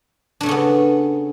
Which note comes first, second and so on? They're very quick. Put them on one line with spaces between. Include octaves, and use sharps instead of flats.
D4 A3 C#3 C#4 B3